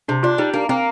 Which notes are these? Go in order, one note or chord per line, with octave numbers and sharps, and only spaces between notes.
C3 D4
D4 F4
G3 D#4
A#3 D4
A#3 C4